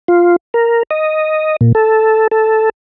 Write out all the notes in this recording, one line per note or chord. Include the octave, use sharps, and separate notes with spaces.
F4
A#4
D#5
A#2
A4
A4